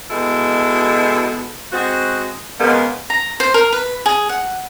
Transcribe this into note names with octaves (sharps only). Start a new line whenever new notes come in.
B2 G#3 E4 F#4 A4
G#3 C4 F#4
C#3 G#3 A#3 B3
A#5
C5
A#4
B4
G#4
F#5